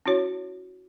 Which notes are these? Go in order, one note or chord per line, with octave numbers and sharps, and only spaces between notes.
C#4 E4 F#4 C#5